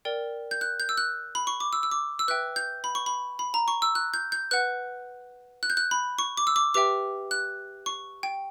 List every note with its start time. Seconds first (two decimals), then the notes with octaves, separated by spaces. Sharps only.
0.05 A#4 D5 G5
0.51 G6
0.61 F#6
0.80 G6
0.89 E6
0.98 F#6
1.35 B5
1.47 C#6
1.60 D6
1.73 E6
1.83 E6
1.91 D6
2.19 E6
2.28 B4 E5 G5 F#6
2.56 G6
2.84 B5
2.95 C#6
3.06 B5
3.39 B5
3.54 A#5
3.68 C#6
3.82 E6
3.95 F#6
4.14 G6
4.32 G6
4.51 B4 F#5 F#6
5.63 F#6
5.70 G6
5.77 F#6
5.91 B5
6.19 C#6
6.37 D6
6.47 E6
6.56 D6
6.74 G4 B4 E5 G5 D6
7.31 F#6
7.86 C#6
8.23 G5